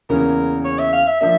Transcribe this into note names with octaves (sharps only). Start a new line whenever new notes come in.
E2 C#3 E3 A#3 C#4 A#4
C#5
E5
F5
E5
F3 A#3 D4 E5